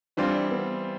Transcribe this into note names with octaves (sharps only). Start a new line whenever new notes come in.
E3 G3 C4 D4 F4
B3